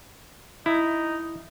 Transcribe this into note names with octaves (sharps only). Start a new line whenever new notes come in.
D#4 E4